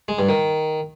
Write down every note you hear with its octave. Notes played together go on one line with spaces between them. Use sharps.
G#3
G2
D#3